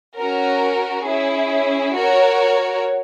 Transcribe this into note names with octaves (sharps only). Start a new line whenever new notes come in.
C#4 F#4 A#4
C#4 E4 G#4
F#4 A#4 C#5